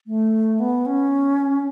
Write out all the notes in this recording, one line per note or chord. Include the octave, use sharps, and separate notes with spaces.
A3
B3
C#4